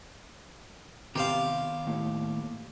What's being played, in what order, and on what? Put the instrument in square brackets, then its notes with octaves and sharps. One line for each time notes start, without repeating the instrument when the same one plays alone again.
[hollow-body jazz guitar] C3 [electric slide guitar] D#3 B3 A#5 [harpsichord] G4 C5 F5
[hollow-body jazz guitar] D#2 A2